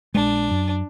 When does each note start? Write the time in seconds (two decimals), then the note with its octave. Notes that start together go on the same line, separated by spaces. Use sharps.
0.15 A#1 G#3 D4
0.51 F#2